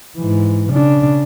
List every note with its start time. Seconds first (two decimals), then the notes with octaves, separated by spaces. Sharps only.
0.17 G#2 E3
0.71 C#3 D4